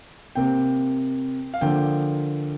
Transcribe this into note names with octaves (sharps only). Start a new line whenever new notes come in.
C3 A#3 G5
F5
D3 F3 A#3 G5